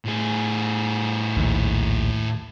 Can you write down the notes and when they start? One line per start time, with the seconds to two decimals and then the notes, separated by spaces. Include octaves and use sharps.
0.06 A2 G#4
1.37 A#1 D#2